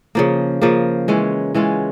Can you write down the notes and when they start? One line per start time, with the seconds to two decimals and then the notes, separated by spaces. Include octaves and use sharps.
0.15 C#3 F3 A#3
0.62 C#3 F3 A#3
1.08 E3 G#3 C#4 F4
1.55 E3 G#3 C#4 F4